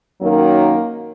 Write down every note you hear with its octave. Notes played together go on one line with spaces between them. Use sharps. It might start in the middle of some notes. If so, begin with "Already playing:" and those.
F#2 D#3 F#3 A#3